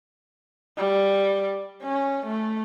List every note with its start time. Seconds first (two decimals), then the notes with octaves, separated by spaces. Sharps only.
0.78 G3
1.83 C#4
2.26 A3